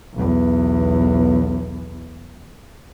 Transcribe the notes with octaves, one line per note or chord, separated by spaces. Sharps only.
B1 E2